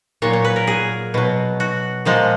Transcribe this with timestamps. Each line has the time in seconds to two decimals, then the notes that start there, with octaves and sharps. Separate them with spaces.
0.22 A#2 F#3 C#5
0.33 C#5
0.45 B4
0.56 A#4
0.67 G#4
1.14 B2 F#3
1.60 F#4
2.05 A#2 F3 G#3